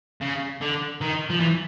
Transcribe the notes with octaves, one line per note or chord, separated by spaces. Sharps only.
C#3
D3
D#3
F3
E3